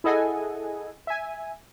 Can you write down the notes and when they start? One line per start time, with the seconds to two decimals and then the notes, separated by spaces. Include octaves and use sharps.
0.04 E4 G#4 A4 D#5 F#5 G#5
1.07 E5 G#5